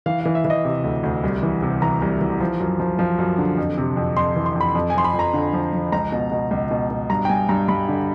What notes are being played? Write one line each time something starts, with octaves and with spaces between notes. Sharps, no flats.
E3 F5
E3 F5
E5
E3
D#5
C3
D2
D2
C2
E3
C3
E3 A#5
C2
E3
F3
F#2
F3
F3
F#2
D3
F2
C3
F2
F2 C6
E3
C6
F2 B5
F2
G#5
F3 C6
B5
F2 A#5
D3
F3
F3
C#2 A#5
B2
B2
C#2
B2
B2
G2 A#5
G5
G2 G#5
G2 A#5
G2 B5
D3